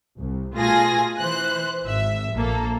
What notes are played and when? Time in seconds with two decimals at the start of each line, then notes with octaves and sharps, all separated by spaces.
0.16 C2
0.55 B2 A3 F4 G#4 G#5 A#6
1.18 E3 C5 F#6
1.86 G#1 E5
2.33 A#1 A#3 A4